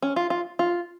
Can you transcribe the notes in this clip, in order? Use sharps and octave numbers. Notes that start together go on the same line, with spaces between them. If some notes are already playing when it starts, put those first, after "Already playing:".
C#4
F4
F4
F4